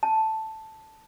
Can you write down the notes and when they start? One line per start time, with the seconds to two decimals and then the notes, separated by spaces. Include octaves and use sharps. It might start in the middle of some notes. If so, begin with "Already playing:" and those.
0.03 A5